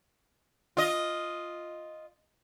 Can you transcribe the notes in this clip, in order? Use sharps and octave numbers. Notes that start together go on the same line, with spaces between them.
F4 D#5